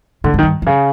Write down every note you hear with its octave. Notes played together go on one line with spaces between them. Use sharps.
A2 D3
G#2
D#3
G2
F#2
C#3